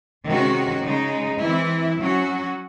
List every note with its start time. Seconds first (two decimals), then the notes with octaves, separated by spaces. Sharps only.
0.26 C3 D#3 G#3 C#4 F#4
0.84 C#3 G#3 D#4
1.41 E3 C4 E4
1.99 F#3 C#4 F#4